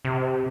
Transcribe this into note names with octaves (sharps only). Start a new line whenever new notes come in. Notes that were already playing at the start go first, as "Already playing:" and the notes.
C3